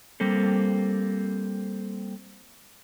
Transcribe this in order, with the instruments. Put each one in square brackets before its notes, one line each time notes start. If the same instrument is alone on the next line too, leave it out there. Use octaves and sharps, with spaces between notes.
[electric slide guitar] G3 A#3 C4 A4